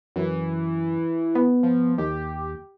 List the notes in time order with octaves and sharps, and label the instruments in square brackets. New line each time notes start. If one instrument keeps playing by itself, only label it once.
[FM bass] F#2 [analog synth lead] E3
[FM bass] B3
[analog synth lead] F3
[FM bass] D#2 [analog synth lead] G4